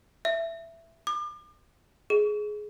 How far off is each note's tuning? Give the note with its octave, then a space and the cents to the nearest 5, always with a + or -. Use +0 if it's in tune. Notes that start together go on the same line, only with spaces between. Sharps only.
E5 +10
D6 +40
G#4 +15